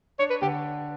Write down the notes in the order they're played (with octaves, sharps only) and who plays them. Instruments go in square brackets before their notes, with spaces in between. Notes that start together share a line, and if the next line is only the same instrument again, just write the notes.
[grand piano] D4 [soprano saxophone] C#5
[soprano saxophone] B4
[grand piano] D3 [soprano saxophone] G4